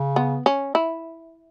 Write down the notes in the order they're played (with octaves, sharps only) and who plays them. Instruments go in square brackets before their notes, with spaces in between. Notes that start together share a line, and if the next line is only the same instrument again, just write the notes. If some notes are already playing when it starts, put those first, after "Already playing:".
Already playing: [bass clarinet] C#3
[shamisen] B3
C#4
E4